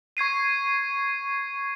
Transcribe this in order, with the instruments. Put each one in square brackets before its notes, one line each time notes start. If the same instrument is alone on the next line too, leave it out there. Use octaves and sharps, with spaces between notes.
[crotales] C#6 G#6 C7 D#7